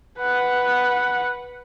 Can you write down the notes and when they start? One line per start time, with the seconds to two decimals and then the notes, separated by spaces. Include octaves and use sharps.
0.20 B4 F#5